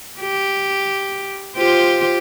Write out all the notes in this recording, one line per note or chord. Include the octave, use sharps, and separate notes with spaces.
G4
F4 G4 C5